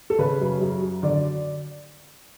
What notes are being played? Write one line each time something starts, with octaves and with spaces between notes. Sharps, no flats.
A4
C#3 B4
F#2
F#2
F#3
D3 D5